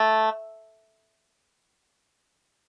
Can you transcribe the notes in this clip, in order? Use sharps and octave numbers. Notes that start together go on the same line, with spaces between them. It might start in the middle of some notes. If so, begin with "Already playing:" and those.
Already playing: A3